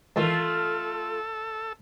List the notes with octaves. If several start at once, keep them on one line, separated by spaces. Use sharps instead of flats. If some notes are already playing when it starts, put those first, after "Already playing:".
G#2 D#3 E3 A3 F4 A4